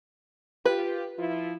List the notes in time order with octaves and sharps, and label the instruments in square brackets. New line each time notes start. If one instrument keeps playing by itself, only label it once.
[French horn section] F4 G4 [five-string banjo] B4
[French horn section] F3 E4 F4